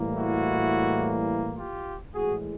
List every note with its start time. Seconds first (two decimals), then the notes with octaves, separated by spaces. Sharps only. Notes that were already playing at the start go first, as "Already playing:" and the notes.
Already playing: A2 E3 G3 A#3
0.15 E4 F#4
1.56 F4 G4
2.13 A2 E3 G#3 F#4 G#4